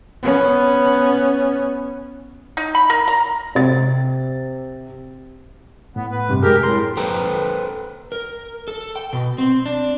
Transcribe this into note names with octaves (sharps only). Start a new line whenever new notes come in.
B3 C#4
D#4
B5
A#4
A#5
C3 A6
A2 B3
B4
G2 C3
F#2 G#3 G4 G#4 A#4
A2 G#4 A#4 C6
A4 B4 C5 G5 A#5
A#4
A4
G5
B2
C4
D4